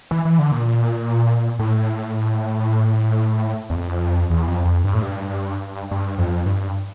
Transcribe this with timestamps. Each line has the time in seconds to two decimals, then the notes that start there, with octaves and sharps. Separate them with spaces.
0.11 E3
0.25 E3
0.39 D3
0.52 A#2
1.59 A2
3.70 E2
3.75 F2
4.30 E2
4.48 F2
4.65 F2
4.84 G2
4.94 A2
5.02 G2
5.91 G2
6.18 F2
6.46 G2